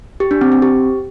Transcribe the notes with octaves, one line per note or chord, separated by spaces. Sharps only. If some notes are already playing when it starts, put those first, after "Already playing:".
G4
D4
C4
C4
G4